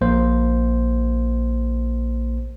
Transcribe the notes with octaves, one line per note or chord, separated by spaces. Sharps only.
A#1 A#3 C5